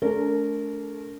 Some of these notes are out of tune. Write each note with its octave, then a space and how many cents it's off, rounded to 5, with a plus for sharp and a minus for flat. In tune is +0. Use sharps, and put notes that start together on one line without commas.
A3 -30 D4 -45 A#4 -15